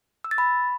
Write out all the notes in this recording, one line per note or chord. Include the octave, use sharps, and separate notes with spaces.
E6
A6
B5